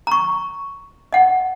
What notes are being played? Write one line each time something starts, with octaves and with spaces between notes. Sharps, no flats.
A#5 C#6
D#5 F#5